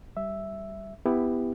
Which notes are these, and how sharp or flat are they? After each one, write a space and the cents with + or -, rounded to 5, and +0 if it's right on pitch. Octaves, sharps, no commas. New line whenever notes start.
G3 +0 E5 +0
B3 +15 E4 +0 G4 +20